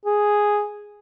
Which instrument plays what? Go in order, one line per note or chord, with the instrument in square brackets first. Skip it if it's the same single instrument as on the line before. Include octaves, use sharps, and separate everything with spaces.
[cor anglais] G#4